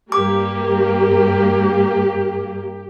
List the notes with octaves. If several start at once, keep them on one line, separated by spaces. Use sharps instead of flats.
G2 A#3 G4 D6